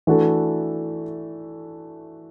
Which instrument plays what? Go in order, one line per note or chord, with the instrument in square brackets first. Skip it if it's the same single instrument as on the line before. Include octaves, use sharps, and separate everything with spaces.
[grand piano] E3 A3 D4 F#4 A4